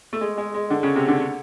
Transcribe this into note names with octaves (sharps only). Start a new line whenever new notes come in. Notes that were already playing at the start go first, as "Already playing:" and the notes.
A3
G#3
G#3
G#3
D3
C#3
C3
D3